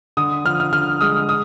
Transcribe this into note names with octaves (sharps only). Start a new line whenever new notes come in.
D3 D#6
F3 F6
F6
D3 F6
G#3 D#6
D#6